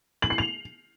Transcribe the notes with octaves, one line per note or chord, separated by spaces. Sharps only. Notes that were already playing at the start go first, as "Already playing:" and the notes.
F#7
C7
F7